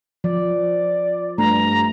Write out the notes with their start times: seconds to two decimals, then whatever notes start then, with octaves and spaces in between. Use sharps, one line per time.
0.24 F3 D5
1.38 G2 A3 A#5